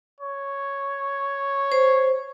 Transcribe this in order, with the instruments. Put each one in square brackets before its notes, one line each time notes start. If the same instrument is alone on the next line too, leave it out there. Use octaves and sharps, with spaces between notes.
[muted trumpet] C#5
[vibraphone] C5